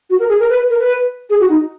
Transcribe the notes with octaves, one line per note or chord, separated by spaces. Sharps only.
F#4
A#4
G#4
A#4
B4
A#4
B4
G#4
F#4
D#4